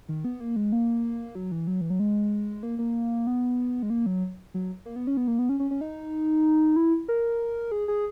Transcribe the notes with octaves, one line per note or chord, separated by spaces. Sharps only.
D#3
B3
A#3
G#3
A#3
F#3
E3
F#3
E3
F#3
G#3
A#3
A#3
B3
G#3
A#3
F#3
F#3
A#3
B3
C#4
B3
A#3
B3
C#4
C#4
C#4
D#4
E4
A#4
G#4
G#4